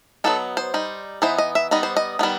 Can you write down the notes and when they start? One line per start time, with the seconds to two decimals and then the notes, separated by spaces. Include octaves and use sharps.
0.24 F#3 B3 D#4 A4
0.57 C5
0.74 G3 D#4
1.22 E3 B3 D#4 C5
1.38 D#5
1.55 E5
1.71 G3 B3 D#4 D#5
1.83 C5
1.97 D#5
2.19 D#3 G3 B3 D#4